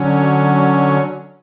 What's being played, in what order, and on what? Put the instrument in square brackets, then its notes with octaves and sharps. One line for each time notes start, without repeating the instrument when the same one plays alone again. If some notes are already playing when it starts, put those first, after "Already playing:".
Already playing: [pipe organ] D3 F#3 C#4